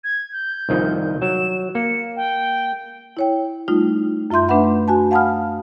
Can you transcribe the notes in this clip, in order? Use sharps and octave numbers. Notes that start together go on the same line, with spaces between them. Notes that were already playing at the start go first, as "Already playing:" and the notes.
G#6
G6
C2 D#3 F3
F#3 E7
A#3 C#7
G5
E4 C#5 G5
G3 A3 D#4 F4
F#2 F4 E5 C6 G6
A3 D4 B4 E5 F#5 B5
F#4 G#5 A5
F5 F#5 A5 B5 D#6 F6